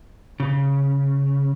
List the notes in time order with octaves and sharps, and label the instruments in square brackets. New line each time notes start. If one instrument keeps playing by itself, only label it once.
[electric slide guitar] C#3